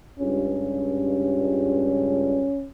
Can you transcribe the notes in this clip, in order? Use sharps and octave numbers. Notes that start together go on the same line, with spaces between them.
C#2 G2 C#4